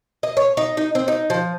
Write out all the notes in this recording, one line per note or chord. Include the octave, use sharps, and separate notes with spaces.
D#5
C#5
D#4
D#4
C4
D#4
F3